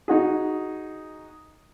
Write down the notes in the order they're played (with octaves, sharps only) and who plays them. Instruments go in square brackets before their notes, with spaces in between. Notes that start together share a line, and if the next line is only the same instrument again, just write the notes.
[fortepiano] D#4 F#4 G#4